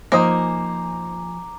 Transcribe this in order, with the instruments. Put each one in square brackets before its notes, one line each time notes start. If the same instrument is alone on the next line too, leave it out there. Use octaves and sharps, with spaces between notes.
[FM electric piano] F3 G#5 [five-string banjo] A#3 [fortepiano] D#4 C5 D#6 [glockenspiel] A#5 D6